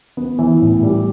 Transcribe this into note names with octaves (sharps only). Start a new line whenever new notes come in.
B3
E3
A2
G3